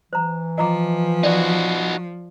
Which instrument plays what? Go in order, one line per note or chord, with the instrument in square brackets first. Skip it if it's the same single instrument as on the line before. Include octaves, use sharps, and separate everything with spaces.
[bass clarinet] E3 [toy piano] C5 A#5
[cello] F3 [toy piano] D#5 A#5 D6
[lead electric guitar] D#4 F#4 [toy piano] D5